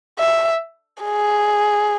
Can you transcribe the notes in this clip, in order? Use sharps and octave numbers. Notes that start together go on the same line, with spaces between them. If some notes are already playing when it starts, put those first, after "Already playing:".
E5
G#4